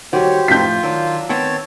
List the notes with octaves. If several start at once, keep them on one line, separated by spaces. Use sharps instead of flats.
D#3 G3 F#4 G4 C5 C#5
F2 A2 F4 G6 B6
D#3 F#3 D4 E6
D#3 B3 C4 C#5 A5 E6